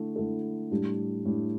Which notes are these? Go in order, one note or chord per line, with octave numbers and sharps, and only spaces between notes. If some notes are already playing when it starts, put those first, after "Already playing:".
Already playing: D3 A3 E4 A4
D3 A3 E4 A4
A2 G3 D4 G4
A2 G3 D4 G4